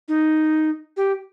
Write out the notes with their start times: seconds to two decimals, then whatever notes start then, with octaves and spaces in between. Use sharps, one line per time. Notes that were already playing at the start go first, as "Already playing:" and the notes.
0.08 D#4
0.97 G4